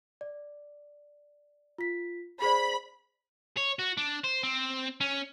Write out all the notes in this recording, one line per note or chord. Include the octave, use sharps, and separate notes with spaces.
D5
F4 B6
G#4 C5 D5 B5
C#5
F#4
D4
C5
C4
C#4